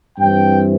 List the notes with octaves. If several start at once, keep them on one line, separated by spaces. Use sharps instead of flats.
G2 E3 C4 G5